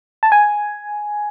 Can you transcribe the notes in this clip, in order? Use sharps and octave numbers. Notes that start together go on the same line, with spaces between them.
A5
G#5